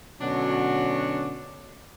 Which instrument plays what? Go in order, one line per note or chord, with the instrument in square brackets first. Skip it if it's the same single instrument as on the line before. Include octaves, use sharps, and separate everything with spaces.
[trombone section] B2 D3 C#4 [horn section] F#3 D4 F#4